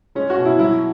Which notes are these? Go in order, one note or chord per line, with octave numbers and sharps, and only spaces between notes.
G#3 C#4
F#4
B2
E4
F#3 E4